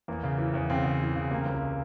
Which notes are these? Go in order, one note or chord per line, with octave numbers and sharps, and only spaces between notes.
E2 A#3
C#3
E3
E2
C#3 C4
C#3
E3
C#3
C3 A#3 C#4
C#2